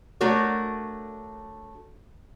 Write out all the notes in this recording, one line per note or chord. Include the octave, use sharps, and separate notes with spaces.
A3 D4 F#4 A#4 C#5